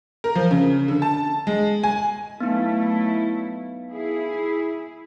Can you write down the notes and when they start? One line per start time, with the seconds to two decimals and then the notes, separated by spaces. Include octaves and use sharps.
0.24 A#4
0.35 F3
0.51 C#3
0.88 D3
1.02 A5
1.47 G#3
1.83 G#5
2.40 F#3 A3 B3 D#4 E4
3.91 E4 G#4